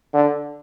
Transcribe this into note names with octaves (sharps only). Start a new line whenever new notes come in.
D3